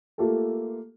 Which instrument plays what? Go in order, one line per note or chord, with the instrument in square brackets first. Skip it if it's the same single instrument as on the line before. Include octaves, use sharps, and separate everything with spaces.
[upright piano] A3 A#3 F4 G4 A4